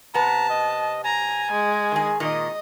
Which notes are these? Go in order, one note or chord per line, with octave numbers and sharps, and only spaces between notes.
C3 B3 A5 A#5
D#5
G#5 A#5
G#3
D#3 G#4
A#2 D#3 D#5